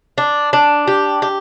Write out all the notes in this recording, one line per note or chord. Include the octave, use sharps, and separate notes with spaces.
D4
D4
G4
G4